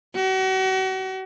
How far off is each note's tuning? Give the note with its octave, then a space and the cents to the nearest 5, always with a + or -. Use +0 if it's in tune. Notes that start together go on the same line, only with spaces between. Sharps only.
F#4 +40